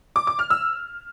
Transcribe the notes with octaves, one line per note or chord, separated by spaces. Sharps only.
D6
D6
F6
E6